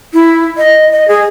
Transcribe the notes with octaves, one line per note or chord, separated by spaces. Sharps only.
E4
D#5
D#5
G#4